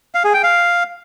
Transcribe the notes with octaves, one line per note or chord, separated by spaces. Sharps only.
F5
G#4
G5
F5